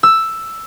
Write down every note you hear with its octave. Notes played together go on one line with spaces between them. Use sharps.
E6